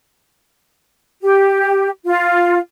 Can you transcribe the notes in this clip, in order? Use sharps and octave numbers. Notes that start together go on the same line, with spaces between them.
G4
F4